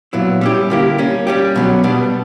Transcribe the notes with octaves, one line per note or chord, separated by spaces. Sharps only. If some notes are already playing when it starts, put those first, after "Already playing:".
A#2 F#3 B3 E4
G3 C#4 E4 G4
D3 A#3 E4 G4
G3 A#3 C#4
G3 C#4 G4
B2 F#3 B3
B2 G3 B3 D4